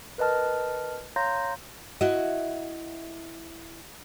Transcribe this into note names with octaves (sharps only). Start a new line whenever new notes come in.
A#4 B4 D#5 A5 F6
C#5 F5 A#5 C6 G6 A#6
E4 F#4 D#5